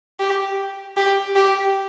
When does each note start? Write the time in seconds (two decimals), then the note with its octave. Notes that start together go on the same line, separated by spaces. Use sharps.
0.20 G4
0.97 G4
1.35 G4